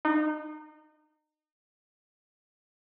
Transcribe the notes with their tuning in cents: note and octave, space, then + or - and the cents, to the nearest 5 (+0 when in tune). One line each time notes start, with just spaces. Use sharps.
D#4 -30